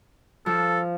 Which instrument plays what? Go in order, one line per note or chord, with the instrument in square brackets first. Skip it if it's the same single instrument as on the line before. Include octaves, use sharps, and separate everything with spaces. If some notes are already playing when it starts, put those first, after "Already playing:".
[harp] F3 [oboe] A4